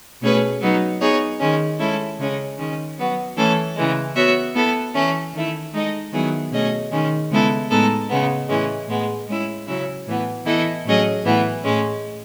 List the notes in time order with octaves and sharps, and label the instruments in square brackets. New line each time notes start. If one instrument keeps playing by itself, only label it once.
[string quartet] B2 A3 C#4 G#4 B4
F#3 B3 D#4
B3 D#4 G#4 C#5
D#3 G#3 C#4
G#3 C#4 E4 A4
C#3 G#3 C#4 G#4
D#3 G#3 C#4
F#3 B3 F#4
E3 A3 C#4 E4 A4
C#3 E3 G#3
B3 F#4 C#5 E5
B3 E4 A4
E3 A3 C#4
D#3 A3 E4
G#3 D#4 A4 D#5
D#3 F#3 B3 E4 G#4
B2 A3 C#4 G#4 D#5
D#3 G#3 C#4
C#3 G#3 B3 E4 A4
A2 G#3 B3 D#4 A4
C#3 G#3 B3
A2 E3 G#3 C#4
A2 G#3 B3
G#3 C#4 E4
C#3 F#3 C#4 E4
A2 E3 B3
E3 B3 E4 A4 D#5
A2 F#3 C#4 G#4 D#5
A2 E3 B3
A2 G#3 C#4